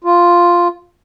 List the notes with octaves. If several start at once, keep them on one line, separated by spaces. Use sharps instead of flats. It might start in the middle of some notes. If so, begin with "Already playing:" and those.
F4